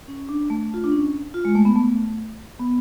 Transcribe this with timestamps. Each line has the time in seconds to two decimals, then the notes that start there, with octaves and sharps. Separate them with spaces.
0.08 C#4
0.29 D4
0.50 A3
0.74 F4
0.84 D4
0.92 C#4
1.34 F4
1.45 G#3
1.55 A3
1.65 B3
1.76 A3
2.60 B3